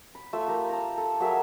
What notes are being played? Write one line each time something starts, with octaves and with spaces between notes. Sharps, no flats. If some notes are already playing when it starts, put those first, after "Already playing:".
B5
A3 F4 C#6 E6
G4 A#4 C6
A5 A#5
A4
F#3 G#4 A#4 E5